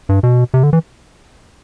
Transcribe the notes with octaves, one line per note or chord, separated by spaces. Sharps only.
G2
B2
C3
D3
E3